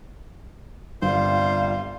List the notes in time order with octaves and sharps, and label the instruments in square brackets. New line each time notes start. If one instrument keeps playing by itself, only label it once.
[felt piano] G1 [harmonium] C3 G3 F4 [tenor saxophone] C5 [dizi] F5